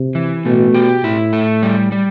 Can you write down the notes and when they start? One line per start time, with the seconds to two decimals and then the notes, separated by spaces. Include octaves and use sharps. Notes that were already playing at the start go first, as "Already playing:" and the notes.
Already playing: C3
0.15 E3
0.45 B2 A3
0.74 G4
1.04 A2 E4
1.33 A3
1.63 G3
1.92 G3